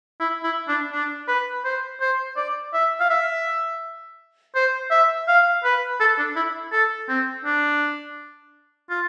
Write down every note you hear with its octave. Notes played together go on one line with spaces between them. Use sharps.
E4
E4
D4
D4
B4
C5
C5
D5
E5
F5
E5
C5
E5
F5
B4
A4
D4
E4
A4
C4
D4
F4